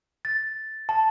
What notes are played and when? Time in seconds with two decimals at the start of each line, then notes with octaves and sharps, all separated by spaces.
0.25 A6
0.89 A5